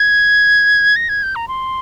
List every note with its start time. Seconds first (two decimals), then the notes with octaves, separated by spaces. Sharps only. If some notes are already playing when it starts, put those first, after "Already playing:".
Already playing: G#6
0.96 A#6
1.09 G#6
1.23 G6
1.36 A#5
1.48 C6